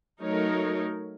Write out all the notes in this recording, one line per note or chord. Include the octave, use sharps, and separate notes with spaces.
F#3 A3 D#4 A#4 C#5